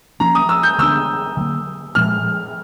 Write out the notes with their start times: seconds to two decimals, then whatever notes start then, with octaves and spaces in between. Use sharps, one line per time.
0.20 F3 A#3 C#4 A#5
0.35 D#6
0.49 E6
0.63 G6
0.78 D3 G3 B3 D4 E6
1.37 D3 F#3 A#3
1.95 A#2 F3 G#3 F6